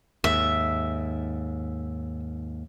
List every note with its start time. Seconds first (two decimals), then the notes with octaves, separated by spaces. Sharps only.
0.24 D#2 G#2 E5